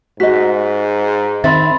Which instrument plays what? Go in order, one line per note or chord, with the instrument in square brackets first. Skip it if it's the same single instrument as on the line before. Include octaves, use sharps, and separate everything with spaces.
[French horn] G#2 [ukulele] F#4 D#5 [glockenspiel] B6
[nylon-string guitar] D#3 C4 [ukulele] E5 [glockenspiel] B5 C6 A6